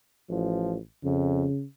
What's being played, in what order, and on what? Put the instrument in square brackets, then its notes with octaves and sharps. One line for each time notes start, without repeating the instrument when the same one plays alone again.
[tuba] A1 [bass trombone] F3
[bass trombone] F2 [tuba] C#3